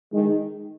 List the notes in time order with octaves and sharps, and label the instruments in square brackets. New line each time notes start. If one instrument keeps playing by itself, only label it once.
[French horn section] D#3 [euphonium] G#3